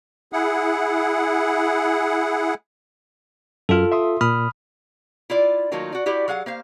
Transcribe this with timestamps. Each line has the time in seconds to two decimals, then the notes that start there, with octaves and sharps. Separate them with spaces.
0.33 E4 G#4 F#5
3.69 F#2 F4 A4 F6
3.92 E5 C6 D#6
4.21 A#2 B5 D#6 F6
5.30 E4 F4 D5
5.72 D#3 F#3 A3 A#3 D#4 F4
5.92 F#4 D5
6.06 E4 F#4 G4 D5
6.28 F#3 G#4 F5 F#5
6.46 A#3 C5 F5